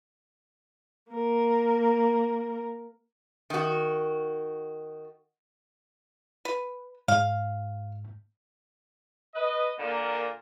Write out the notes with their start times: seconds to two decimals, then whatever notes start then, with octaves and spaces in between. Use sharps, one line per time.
1.11 A#3 A#4
3.50 D#3 F#4
6.45 B4
7.08 G#2 F5
9.35 B4 D#5
9.78 A#2 D3 A#3